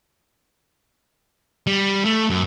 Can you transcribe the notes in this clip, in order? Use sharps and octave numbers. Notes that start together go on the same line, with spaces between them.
G3
A3
F#2